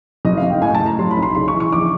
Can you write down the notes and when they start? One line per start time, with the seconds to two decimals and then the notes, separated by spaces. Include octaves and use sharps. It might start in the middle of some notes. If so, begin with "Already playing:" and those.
0.25 F#1 D#5
0.37 F5
0.43 F#1
0.50 G5
0.61 A2 G#5
0.74 A5
0.80 A2
0.86 A#5
0.99 F#3 C6
1.11 B5
1.17 B1
1.23 C6
1.35 C#3 C6
1.48 C#6
1.54 E3
1.60 C#6
1.72 A#1 D6